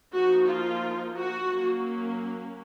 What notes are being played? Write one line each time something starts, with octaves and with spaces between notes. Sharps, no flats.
F3 A#3 D#4 F#4
F4
F#4
F#3 A#3 C#4